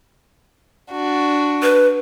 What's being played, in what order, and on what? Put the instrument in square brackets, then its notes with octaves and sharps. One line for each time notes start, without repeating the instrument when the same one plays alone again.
[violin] D4 F#4
[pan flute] B4